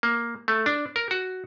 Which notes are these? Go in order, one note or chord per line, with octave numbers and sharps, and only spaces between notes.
A#3
A3
D4
A#4
F#4